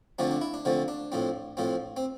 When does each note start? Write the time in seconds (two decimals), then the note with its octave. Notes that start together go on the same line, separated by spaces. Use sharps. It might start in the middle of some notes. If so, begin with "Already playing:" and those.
0.19 D3 F3 A3 C4 D4
0.31 D4
0.41 E4
0.54 D4
0.65 D3 F3 A3 C4
0.88 D4
1.12 A2 F3 C4
1.57 A2 F3 C4
1.97 C4